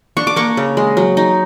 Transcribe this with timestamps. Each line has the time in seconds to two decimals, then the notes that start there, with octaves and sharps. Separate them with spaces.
0.17 D4 C#6
0.27 D6
0.36 A#3 C#6
0.57 C#3
0.77 G#3
0.97 F#3
1.17 D#4